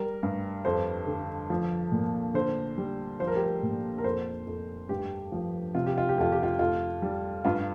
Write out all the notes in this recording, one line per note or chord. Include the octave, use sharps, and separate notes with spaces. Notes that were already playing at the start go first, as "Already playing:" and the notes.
Already playing: G3 A#4
G2
F2 C5
D3
F3
A#2
D3 C5
G3
F3 C5
A#4
G4
A#4
A#2
A#4
F2 C5
F2
G2 G4
F3
C3 F4
G4
F4
G4
F2 F4
G4
F4
F2 F4
G3
G2 F4